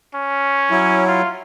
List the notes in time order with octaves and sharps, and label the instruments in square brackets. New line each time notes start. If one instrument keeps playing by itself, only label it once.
[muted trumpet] C#4
[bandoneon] F#3 E4
[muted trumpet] F4